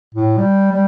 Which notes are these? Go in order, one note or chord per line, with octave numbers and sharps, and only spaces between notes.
A2
G3
G3